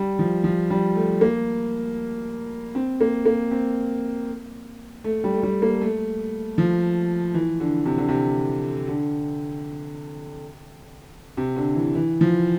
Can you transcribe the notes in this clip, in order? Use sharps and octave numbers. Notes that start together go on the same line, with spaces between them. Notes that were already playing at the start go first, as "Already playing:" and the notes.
Already playing: G3
F3
F3
G3
A3
A#3
C4
A#3
A#3
C4
A3
G3
A3
G3
A#3
A3
F3
E3
D3
C3
D3
C3
D3
C3
D3
E3
E3
F3